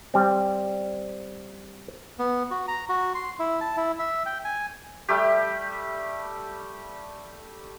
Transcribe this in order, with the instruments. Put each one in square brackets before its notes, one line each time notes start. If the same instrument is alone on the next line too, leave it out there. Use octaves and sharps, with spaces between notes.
[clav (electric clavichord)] G3 C4
[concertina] B3
F#4
A#5
F#4
C6
E4
A5
E4
E5
G5
G#5
[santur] G3 A3 G4